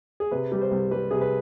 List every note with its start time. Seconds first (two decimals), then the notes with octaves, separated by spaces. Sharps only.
0.20 G#4
0.31 C3 B4
0.52 G3
0.61 C5
0.71 C2
0.91 G3 B4
1.11 C3 G#4
1.21 B4